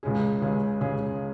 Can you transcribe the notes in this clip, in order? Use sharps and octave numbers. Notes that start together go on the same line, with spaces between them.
C#2 C#3 G#3 C#4 G#4
C#2 C#3 G#3 C#4 G#4
C#2 C#3 G#3 C#4 G#4